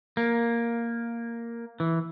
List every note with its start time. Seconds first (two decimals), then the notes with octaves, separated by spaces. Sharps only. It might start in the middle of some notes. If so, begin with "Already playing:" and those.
0.17 A#3
1.80 E3